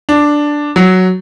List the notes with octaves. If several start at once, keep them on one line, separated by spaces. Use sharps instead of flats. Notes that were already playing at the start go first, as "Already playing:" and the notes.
D4
F#3